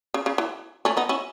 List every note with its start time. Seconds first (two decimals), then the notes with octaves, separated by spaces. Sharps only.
0.14 C#3
0.26 C#3
0.38 E3
0.85 A3 C#4
0.97 B3 D#4
1.09 C#4 E4